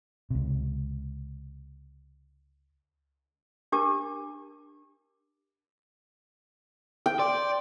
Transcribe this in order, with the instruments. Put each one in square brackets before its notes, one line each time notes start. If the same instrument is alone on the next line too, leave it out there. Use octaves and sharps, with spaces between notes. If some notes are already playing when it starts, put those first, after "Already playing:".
[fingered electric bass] C#2 C3
[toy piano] D4 G4 A#4 A5 D6
[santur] G5
[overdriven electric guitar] D5 [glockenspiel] C6 D6